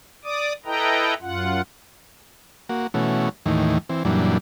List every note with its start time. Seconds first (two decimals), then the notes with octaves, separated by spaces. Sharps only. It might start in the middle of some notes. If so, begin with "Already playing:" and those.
0.24 D5 D6 D#6
0.65 E4 A4 B4 D#5 G5 A#5
1.22 F#2 F4 F#5
2.69 A#3 F#4
2.94 B2 E3 A3 C#4 F#4
3.46 D#2 A2 D#3 E3
3.89 E3 C4
4.05 F#2 A#2 E3 G3 D4